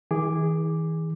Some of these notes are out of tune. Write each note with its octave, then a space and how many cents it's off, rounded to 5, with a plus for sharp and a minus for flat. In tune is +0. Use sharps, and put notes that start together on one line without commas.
E3 -45 G#4 -15 D6 +0